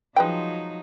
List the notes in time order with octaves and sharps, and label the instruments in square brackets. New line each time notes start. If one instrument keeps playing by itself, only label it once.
[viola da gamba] F3 F#3 D#4 [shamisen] G#3 B4 G5